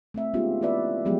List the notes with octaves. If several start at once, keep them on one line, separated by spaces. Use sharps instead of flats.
A3 C4 E5
G#3 B3 C#4 D#4 F4 G4
E3 B3 E4 B4 D5 E5
F3 F#3 G#3 B3 G4